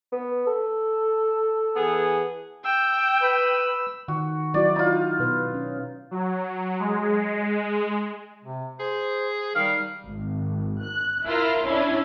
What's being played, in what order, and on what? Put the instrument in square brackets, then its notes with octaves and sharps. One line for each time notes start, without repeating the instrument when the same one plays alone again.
[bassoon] B3
A4
[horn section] E3 B3 G#4
[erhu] G5 [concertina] E6
[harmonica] B4
[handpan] D#3 [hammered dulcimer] F#4
[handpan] F#3 E4 F#4 [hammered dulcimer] D5
[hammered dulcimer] D#4 F4
[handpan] B2 B4
C#4
[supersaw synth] F#3
G#3
[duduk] C3
[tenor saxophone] G#4 [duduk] C5
[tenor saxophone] D#3 [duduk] G3 [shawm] F5
[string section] G#1
F#6
E4 F4 A#4
C#4 D4 E4